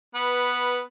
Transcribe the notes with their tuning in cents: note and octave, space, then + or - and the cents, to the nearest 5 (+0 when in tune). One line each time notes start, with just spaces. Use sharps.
B3 +0 B4 -10